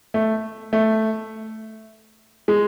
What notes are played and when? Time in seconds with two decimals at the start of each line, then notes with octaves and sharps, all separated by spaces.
0.14 A3
0.73 A3
2.48 G#3